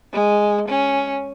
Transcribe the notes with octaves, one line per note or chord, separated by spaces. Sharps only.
G#3
C#4